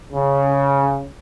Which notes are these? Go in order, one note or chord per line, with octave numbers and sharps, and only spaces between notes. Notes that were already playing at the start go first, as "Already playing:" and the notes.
C#3